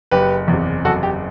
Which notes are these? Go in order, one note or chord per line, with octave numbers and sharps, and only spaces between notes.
F#1 G4 B4
E2
C3
F#1 F#4 A4
G4